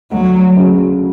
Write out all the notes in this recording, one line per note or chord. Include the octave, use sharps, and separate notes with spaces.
D2 F#3
C#3 F#3